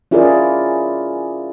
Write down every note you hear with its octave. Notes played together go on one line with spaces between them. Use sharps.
C#4 E4 F4 G#4 A#4 D5